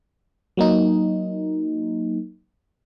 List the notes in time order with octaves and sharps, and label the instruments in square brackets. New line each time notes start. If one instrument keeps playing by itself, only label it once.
[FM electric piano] F#3 A#3 D#4